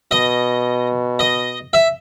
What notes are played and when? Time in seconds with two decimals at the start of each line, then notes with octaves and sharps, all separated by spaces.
0.11 B2 D#5
1.19 D#5
1.73 E5